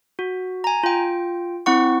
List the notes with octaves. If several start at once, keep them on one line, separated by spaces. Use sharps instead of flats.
F#4
G#5 A#5
F4 G5
C4 E4 F#5 C#6